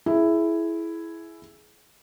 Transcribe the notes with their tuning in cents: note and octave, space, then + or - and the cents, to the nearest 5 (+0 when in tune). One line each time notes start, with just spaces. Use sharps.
E4 +5 G#4 +25